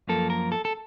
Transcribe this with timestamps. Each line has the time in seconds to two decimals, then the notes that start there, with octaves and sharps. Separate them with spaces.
0.08 F#2 F3 A#3 A4
0.30 A#4
0.52 A4
0.65 A4